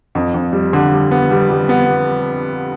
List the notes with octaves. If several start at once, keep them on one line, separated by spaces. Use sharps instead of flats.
F2
F2
G3
D3
G3
B3
G3
G3
B3